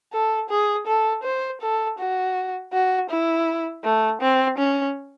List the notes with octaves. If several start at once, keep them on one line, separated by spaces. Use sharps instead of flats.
A4
G#4
A4
C5
A4
F#4
F#4
E4
A3
C4
C#4